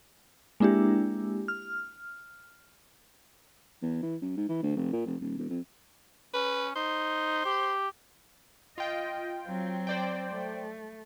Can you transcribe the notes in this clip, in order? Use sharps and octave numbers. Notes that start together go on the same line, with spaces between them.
G#3 A#3 D4 E4 G4
F6
E2
E3
F#2
G#2
E3
D2
F1
A#2
F1
D#1
E1
F2
C#4 B4
D#4 C5
G4
F4 D#5 G5
F#3 C4
C5 D5 G5
A3